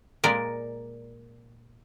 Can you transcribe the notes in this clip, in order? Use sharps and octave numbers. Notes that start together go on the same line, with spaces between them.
A#2 G#3 A#4 D5